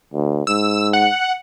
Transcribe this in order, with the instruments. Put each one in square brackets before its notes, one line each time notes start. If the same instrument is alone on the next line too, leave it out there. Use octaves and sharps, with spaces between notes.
[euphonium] D2
[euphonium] G#2 [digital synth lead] E6
[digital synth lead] F#5